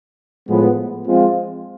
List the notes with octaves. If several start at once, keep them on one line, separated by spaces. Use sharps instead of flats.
A2 F3 G#3 B3
F3 G#3 C4 F4